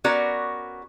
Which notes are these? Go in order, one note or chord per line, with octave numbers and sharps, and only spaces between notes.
B3 C#4 F#4 A#4 D5